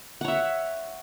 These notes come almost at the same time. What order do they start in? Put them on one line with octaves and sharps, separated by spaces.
F#5 C#5 E5